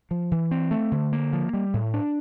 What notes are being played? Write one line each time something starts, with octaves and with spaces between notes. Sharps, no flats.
F3
E3
C4
A3
D3
A#3
F3
G3
A2
D4